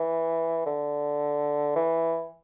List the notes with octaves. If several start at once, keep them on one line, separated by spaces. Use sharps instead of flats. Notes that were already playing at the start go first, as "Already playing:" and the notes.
Already playing: E3
D3
E3